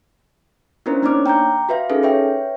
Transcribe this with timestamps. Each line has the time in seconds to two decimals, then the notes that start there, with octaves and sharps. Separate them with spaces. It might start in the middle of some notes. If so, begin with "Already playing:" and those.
0.86 B3 C#4 D4 E4 A#4 C5
1.03 A#3 D4 D#4 C#5 D6 F6
1.26 G5 A#5 D6 G6
1.69 F#4 B4 E5 F5
1.90 C#4 D#4 G#4 A4 B4
2.03 B4 C#5 E5 G5